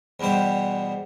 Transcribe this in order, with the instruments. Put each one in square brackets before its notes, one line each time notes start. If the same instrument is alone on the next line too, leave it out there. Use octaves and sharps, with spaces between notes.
[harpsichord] E2 B2 G3 C5